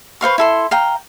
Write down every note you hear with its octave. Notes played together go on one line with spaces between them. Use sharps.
B4 C5 F5 C#6
E4 A4 C6
F5 G5 A#5